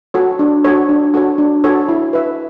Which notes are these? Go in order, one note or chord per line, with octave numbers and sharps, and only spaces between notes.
F#4 A4 C#5
D4
F#4 A4 C#5
D4
F#4 A4 C#5
D4
F#4 A4 C#5
E4
B4 E5